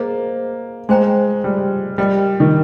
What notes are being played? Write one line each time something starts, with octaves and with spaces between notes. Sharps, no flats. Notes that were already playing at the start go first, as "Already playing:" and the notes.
Already playing: A#3 G#4 C5 D#5 A#5
G#3 G#4 C5 G5 A#5
G3
G3 A#4 D#5 G5
D#3